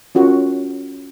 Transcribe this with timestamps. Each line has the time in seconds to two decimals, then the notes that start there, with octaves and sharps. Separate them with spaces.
0.15 C#4 F4 F#4 A#4